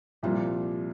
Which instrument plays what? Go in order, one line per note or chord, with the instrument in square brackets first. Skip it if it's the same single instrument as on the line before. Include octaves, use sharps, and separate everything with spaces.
[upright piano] C2 A#2 F3 [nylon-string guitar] G3